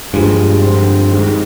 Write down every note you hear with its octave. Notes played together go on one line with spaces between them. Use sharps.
G2 A#2 F3 G#3
D3 F3 C4
G#2 D#3 G#3